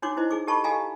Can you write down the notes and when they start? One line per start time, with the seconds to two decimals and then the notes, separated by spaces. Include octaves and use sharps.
0.02 D4 D#4 F#4 C#5 D6
0.17 E4 C5 D#5
0.31 D#4 G#4 D6
0.47 G4 A4 D#5 A5 B5 C#6
0.64 G4 A4 D#5 F5 G#5 A#5